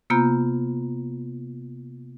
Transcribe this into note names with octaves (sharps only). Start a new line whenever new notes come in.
C3 A#3 B3 F4 A#5 G6